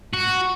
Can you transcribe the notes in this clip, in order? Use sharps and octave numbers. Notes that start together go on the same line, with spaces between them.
F#4